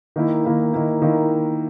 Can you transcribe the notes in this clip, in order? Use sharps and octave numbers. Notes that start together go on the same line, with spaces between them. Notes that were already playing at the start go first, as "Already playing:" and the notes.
D#3 A#3 E4
D#3 A#3 E4
D#3 A#3 E4
D#3 A#3 E4